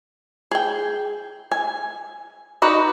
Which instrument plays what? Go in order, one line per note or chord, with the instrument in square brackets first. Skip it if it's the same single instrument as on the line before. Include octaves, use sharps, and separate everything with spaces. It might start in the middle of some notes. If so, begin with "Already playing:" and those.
[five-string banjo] G#4 G5
G#5
D#4 F#4 B4 D5 D#5